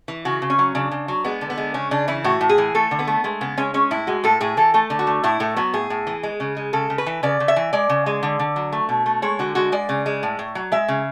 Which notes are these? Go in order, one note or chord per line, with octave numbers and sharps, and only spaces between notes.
E3
C#3 F#4
C#3
C#4
F#3
C#3 D4
C#3
F#3
G#3 B3
D3
B3
G#3
C#3 C#4
C#3 D4
E3 E4
A2 F#4
A2
G#4
E3
A3 A4
D3
B3
A3
G#3 A3
C#3 B3
G#3 C#4
G#3 C#4
A2 E4
G#3 F#4
A2 A4
A2 G#4
E3 A4
A3 A4
D3
F#4
A3
A2 E4
A2 A3
F#3 B3
A2 G#4
A2
E3
G#3
C#3
G#3
C#3 A4
C#3
B4
E3
C#3 D5
C#3
E5
E3
G#3 D5
C#3
G#3
D3
D3
F#3
A3
B2
A3
G#3 C#5
D3 F#4
G#3 F#4
G#3 D5
C#3
G#3
A2
A2
F#3
G#3 E5
C#3